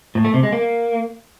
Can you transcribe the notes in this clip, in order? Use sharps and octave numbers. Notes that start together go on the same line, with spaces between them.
A2
A3
C3
G#3
A#3